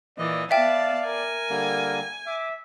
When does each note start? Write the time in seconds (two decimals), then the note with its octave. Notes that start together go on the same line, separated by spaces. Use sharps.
0.19 A#2 E3 D5 D#5
0.51 B3 D5 E5 F5 G5 A5
1.06 A#4 G#5
1.50 D3 G3 A#3
2.27 E5 D6